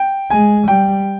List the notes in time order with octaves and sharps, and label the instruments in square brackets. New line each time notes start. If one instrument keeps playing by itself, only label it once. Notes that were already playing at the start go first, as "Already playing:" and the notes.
Already playing: [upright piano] G5
[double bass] G#3 [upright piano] G#5
[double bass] G3 [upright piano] G5